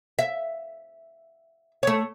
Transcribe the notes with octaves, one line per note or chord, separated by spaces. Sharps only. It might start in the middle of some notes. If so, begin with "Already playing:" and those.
E5
A3 C#5